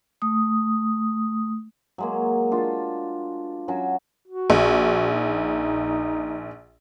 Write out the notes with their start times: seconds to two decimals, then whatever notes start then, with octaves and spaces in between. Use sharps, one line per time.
0.22 A3 D#6
1.98 F#3 G#3 A#3
2.51 D4 F4 A5
3.68 F#3 C#4 F#4
4.27 F#4
4.50 A#1
5.11 D#4